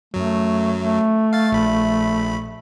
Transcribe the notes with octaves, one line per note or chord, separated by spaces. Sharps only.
F#2 F#3 A3
A3
F5 A6
A#1 B5